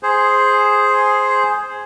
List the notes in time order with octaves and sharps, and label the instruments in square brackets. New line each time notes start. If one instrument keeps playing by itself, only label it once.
[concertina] G#4 C5